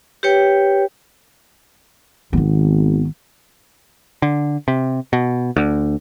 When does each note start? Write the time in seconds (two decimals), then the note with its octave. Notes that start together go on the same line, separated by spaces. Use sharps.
0.23 G4 B4 C#5 G5
2.33 G#1 D#3 B3
4.22 D3
4.68 C3
5.13 B2
5.56 D2